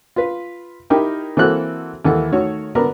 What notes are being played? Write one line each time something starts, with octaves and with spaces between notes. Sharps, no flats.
F4 B4
D#4 E4 G4 A#4 G5
E3 A#3 C4 F#4 A4 F#6
D#2 E3 A4 F#5
D#3 A3 F#4 C#5
D3 B3 D4 A#4 A#5